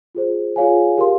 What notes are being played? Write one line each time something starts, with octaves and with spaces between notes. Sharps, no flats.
F4 G#4 C5
F4 G#4 C#5 F5 G#5
G4 A#4 F5 C6